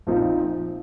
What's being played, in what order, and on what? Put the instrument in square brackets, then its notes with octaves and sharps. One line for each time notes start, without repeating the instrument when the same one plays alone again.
[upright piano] A#1 A#2 F3 C4 D#4